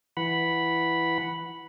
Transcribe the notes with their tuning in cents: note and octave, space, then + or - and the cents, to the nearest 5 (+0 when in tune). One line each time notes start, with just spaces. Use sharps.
E3 +10 F#5 +0 B5 -5